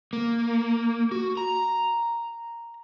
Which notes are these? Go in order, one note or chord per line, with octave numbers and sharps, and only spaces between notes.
A#3
F#4
A#5